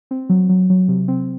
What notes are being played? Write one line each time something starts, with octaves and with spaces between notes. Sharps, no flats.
C4
F#3
F#3
F#3
C3
C4